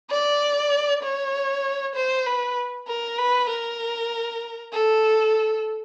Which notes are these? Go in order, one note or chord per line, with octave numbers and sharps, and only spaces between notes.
D5
C#5
C5
B4
A#4
B4
A#4
A4